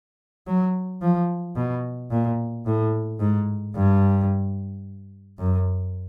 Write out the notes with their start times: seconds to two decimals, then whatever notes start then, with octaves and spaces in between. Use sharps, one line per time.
0.47 F#3
1.02 F3
1.56 B2
2.11 A#2
2.66 A2
3.20 G#2
3.75 G2
5.39 F#2